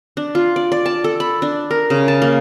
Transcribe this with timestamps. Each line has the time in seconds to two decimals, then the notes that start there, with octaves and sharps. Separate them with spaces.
0.17 D4
0.35 F4
0.56 D5
0.72 D5
0.86 A5
1.04 A4
1.20 B5
1.42 D4
1.71 A#4
1.90 C#3
2.08 A5
2.22 A#3